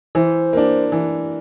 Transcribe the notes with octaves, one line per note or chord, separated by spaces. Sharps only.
E3 C5
A#3 D4
E3